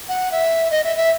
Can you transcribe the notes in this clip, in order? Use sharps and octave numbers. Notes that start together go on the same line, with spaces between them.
F#5
E5
D#5
E5
E5